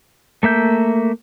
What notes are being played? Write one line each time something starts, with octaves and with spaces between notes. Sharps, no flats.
A3 A#3 E5 G6